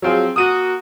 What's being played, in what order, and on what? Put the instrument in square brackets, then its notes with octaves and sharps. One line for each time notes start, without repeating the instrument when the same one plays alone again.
[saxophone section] F3 C4 [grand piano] F#3 F4 G#4
[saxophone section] A#3 F#4 [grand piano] D#6 D#7